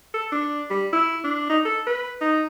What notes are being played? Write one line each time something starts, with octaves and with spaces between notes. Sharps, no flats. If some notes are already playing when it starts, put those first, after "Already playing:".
A4
D4
G3
E4
D4
D#4
A4
B4
D#4